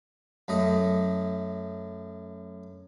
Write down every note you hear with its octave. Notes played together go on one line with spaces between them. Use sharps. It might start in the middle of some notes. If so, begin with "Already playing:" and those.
F#2 A3 D#5